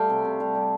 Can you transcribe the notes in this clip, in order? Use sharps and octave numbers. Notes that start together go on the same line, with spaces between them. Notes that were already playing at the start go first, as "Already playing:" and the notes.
Already playing: G3 A3 F5 G5
C3
C3
G3 F5
G3